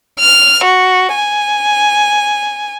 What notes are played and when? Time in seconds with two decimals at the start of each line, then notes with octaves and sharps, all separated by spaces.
0.20 F6
0.64 F#4
1.15 G#5